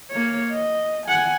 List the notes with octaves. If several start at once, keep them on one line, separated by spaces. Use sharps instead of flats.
A#3 C#5
D#5
F#5 G#5